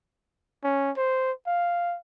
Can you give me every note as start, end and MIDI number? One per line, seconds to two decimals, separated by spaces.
0.64 0.91 61
0.97 1.32 72
1.47 1.96 77